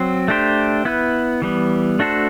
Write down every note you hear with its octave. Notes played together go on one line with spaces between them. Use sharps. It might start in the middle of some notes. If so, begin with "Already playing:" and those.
Already playing: F#3 C4
A3 D4 G4 C5
B3 E4 B4
E3 G3 B3
A3 D4 F#4 A4 C5